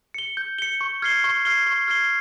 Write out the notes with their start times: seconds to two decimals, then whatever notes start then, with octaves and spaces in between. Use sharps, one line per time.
0.14 C#7 G7
0.37 G6
0.59 C#7 G7
0.81 C#6
1.02 F6 G#6 C7 G7
1.24 C#6
1.45 F6 G#6 C7 G7
1.66 C#6
1.88 F6 G#6 C7 G7